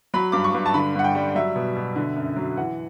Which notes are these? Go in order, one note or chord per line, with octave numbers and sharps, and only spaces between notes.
F#3 B5
G2 D6
C#6
G2
A5
D3 B5
G2 F#5
G5
G3
F#3 E5
B2
B2
D3
F#2
F#3
E3 F#5